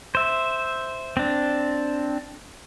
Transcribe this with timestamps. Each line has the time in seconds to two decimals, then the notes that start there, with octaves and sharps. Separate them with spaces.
0.15 C5 E5
1.17 C4 D4